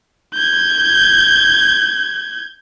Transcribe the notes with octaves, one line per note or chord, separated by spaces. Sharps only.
G6 G#6